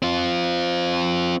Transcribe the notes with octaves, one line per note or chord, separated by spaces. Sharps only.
C4 F4